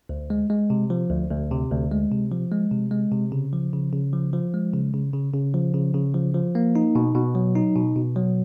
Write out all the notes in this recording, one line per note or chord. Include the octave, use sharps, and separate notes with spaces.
D2
G#3
G#3
C3
F3
D2
D2
C3
D2
G#3
C3
F3
G#3
C3
G#3
C3
C#3
F3
C#3
C#3
F3
F3
G#3
C#3
C#3
C#3
C#3
F3
C#3
C#3
F3
F3
A#3
D#4
B2
B2
F#3
D#4
B2
B2
F#3